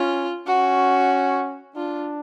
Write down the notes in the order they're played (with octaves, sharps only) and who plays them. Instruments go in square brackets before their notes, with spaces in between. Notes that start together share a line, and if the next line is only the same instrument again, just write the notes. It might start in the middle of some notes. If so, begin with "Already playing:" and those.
Already playing: [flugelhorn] C#4 [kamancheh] F4
[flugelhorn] C#4 [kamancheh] F#4
[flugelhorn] D4 [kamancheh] F4